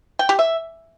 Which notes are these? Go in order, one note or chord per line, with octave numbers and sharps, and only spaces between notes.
G5
G4
E5